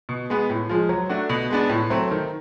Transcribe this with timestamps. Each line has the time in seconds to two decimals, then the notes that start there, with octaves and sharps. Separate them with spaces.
0.09 B2
0.30 G#3 B3
0.50 A2
0.69 F3 G#3
0.89 F#3
1.09 A3 D4 F#4
1.30 B2
1.50 G#3 B3 D4
1.70 A2
1.90 F#3 A3 C4
2.11 D#3